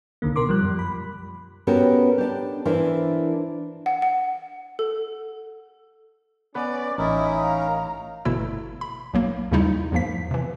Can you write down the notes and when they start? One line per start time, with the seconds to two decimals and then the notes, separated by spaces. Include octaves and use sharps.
0.22 C2 D3 D#3 A#3
0.36 B2 A#4 C6 D6
0.49 F3 G3 F#6
0.63 F#2
0.79 B5
1.67 B3 C#4 F#4 G4 A4 A#4
2.18 D4 G4
2.65 E3 D4 E4 A#4 C5
3.86 F#5
4.02 F#5
4.79 A4
6.55 B3 C#4 B4 D5
6.98 A1 C#4 D#4 E4 A#4 D#5
7.42 F5 A#5
8.25 G1 B2 E3 A3 E4 E6
8.81 B5
9.14 B1 F#3 A#3
9.52 D#2 C#3 G3 D#4 E4
9.92 E2 G#2 F3 A#3 B6
10.31 C3 E3